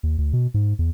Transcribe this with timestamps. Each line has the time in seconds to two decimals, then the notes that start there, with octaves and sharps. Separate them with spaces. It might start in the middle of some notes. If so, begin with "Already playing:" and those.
0.03 D#2
0.18 D2
0.33 B2
0.54 G#2
0.79 E2